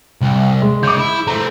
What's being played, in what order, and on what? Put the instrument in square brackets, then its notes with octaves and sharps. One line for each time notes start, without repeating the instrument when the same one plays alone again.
[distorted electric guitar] C2
[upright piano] G#3
[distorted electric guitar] C#3 [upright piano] D6 G6
[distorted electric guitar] E4
[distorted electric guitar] A3 C4 [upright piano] A#5